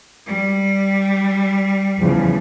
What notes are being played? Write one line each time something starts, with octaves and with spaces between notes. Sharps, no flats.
G3
E2 C#3 F3